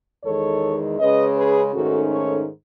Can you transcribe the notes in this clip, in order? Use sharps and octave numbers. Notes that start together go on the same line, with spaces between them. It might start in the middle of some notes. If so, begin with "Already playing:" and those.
E2 D#3 G#3 A4 C#5
C#3 G#3 C#4 B4 D#5
G#4 B4
G#2 D#3 A3 C#4 F#4 A4
A4 C#5